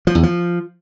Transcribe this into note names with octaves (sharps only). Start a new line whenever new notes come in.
F3
E2
F3